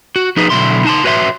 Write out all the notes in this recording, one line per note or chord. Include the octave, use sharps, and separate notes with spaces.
F#4
F3 D#4 G#4 B4
B1 F2 B2 D3 E4 C6
D#4 A5 C6
F#4 B4 C#5 E5 C6